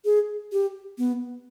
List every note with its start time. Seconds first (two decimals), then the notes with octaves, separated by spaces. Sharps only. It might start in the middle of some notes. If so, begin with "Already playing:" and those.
0.05 G#4
0.52 G4
0.98 B3